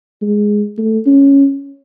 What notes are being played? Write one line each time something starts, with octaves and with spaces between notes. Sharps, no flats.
G#3
A3
C#4